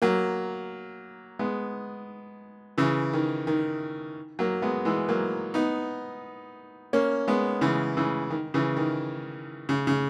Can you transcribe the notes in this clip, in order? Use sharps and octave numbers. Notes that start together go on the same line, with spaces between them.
F#3 A#3
G#3 B3
C#3 E3
D#3
D#3
F#3 A#3
G#3 B3
E3 G#3
F#3 A#3
B3 D#4
A#3 C#4
G#3 B3
C#3 E3
C#3 E3
D#3
C#3 E3
D#3
C#3
C#3